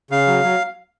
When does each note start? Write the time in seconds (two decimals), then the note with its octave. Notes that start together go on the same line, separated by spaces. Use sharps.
0.11 C#3 F5
0.27 F#3
0.43 F#3